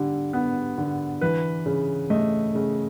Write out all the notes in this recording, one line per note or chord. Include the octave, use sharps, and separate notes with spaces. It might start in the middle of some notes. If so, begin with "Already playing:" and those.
Already playing: D3 G3
B3
D3
E3 B4
C#3
A3 D#5
C#3